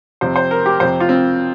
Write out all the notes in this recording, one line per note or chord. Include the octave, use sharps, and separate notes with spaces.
F2 C3 C5
C5
A#4
G4
F2 C3 C5
F4
C4